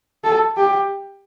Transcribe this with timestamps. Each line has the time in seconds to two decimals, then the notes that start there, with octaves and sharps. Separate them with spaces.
0.24 A4
0.57 G4